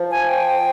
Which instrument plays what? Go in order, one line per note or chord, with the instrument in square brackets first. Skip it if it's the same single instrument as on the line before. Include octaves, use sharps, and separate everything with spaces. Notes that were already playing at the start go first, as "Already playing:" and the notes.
Already playing: [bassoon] F3
[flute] G#5
G5